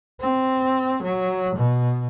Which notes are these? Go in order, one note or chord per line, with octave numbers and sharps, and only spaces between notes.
C4
F#3
B2